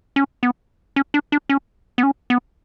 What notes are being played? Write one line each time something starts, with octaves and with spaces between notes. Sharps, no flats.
C#4
B3
C#4
D4
D4
C#4
B3
C#4
B3